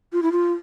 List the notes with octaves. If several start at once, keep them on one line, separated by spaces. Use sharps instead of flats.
F4
E4
F4